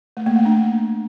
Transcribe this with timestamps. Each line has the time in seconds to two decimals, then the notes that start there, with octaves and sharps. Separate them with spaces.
0.17 A3
0.26 A#3
0.36 A3
0.45 D4